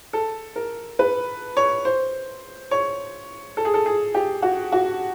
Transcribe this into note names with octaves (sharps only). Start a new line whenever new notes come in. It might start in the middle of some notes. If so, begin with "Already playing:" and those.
A4
A#4
B4
C#5
C5
C#5
A4
G#4
A4
G#4
G4
F#4
F#4